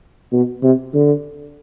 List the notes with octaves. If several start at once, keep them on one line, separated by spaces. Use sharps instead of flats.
B2
C3
D3